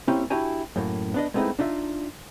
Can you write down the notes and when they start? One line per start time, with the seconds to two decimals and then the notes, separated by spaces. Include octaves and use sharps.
0.08 A#3 C4 C#4 E4 G4
0.30 D4 E4 F#4 G4 G#5
0.76 F#2 A2 A#3
1.14 B3 D4 D#5
1.34 G#3 A3 B3 C4 D#4 E4
1.59 D4 D#4 F4 E5